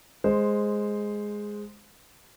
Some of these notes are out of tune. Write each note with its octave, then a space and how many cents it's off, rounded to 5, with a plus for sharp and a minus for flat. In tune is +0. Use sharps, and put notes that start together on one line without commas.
G#3 +0 C5 +0